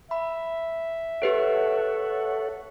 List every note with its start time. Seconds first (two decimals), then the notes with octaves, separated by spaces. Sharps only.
0.11 E5 B5
1.22 G4 A4 B4 C#5 F#5 D7